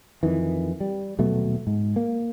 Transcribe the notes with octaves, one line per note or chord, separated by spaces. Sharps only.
F2 D#3 E3
G3
D#1 B2 F#3 A3
G#2
A#3